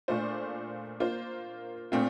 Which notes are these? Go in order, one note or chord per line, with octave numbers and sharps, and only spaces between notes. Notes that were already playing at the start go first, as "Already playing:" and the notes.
A#2 A3 D4 F4 C5
A#3 F4 C5
A#2 A3 C4 F4